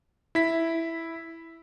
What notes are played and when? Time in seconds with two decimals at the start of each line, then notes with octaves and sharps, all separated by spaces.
0.35 E4 B6